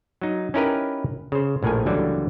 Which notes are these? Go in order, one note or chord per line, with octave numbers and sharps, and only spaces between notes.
F#3 D#4
C#4 D#4 E4 G4 A#4 B4
C#3 C5
A#1 A2 F3 A#4 G#5
C#2 D3 E3 F#3 G3 A#3